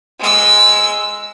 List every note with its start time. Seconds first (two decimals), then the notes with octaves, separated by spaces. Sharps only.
0.20 G#3 E6